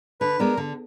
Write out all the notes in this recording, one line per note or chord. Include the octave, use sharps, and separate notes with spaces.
D3 B4
G#3 B3 D4 A#4
D3